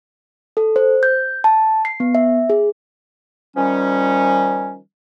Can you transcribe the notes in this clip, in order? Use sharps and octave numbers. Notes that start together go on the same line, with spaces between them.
A4
C5
G6
A5
C7
B3
E5
G#4
D#3 F3 G3 C#4